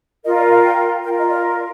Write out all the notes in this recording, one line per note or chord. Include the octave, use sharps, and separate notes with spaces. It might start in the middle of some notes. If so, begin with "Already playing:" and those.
F4 A#4 D#5
D5
F5
G5
F4 A#4 G5
D#5
D5